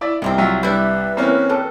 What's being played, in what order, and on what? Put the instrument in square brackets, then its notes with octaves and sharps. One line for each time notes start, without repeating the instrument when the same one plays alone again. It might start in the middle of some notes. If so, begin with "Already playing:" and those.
[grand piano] E4 D5 E5
[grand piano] C2 [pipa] D#3 F3 C4
[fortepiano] F#3 F4 E5
[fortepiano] G3 [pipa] D4 E4 [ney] B4
[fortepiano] E3 A#3 [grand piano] C4 C#4
[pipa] F#3 G3 [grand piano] A4